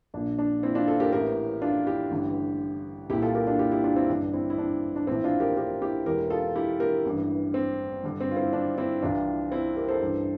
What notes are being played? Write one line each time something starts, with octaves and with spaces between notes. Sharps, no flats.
A#1 A#2 D4
D4
C4 E4
D4 F4
F4 A4
G4 A#4
A1 A2 E3 G4 A#4
D4 F4
E4 G4
A1 G2 D3
C2 A#2 E4 G4
F4 A4
G4 A#4
D4 F4
E4 G4
E4 G4
D4 F4
C4 E4
A1 G2 D3 D4
C4 E4
E4
D4
D4
A#1 A2 E3 C4 E4
D4 F4
G4 A#4
G4 A#4
E4 G4
E1 E2 E3 G4 A#4
F4 A4
E4 G4
G4 A#4
A1 G2 E3
C4
G1 G2 D3
C4
F4
C4 E4
D4
C4 E4
C2 C3 E3 D4 F4
C4 E4
G4 A#4
A4 C5
A1 G2 E3